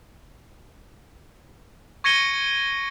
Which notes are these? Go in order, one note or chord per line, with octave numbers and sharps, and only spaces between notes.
C#6 G#6 A#6 C#7 D#7 G7